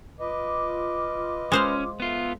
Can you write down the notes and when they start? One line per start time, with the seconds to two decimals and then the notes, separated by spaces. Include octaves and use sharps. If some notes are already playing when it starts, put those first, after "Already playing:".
0.20 F4 B4 D#5 D6
1.52 G#3 C#4 C5 F5
2.00 B3 F4 A4 E5